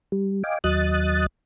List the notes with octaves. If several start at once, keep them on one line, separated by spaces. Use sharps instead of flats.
G3
D#5 F5 G5 G#5 D6
D#2 F#3 D#5 D#6 F#6 A6